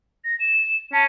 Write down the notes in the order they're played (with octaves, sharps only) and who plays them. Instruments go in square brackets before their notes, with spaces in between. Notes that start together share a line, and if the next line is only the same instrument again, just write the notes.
[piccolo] A#6
E7
[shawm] C#4 [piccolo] A5